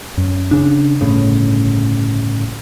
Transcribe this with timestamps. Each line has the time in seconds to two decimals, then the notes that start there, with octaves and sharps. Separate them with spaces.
0.18 F#2
0.51 C#3 D4
1.01 G1 A2 C#3